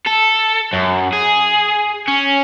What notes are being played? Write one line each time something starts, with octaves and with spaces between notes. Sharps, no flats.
A4
F#2
G#4
C#4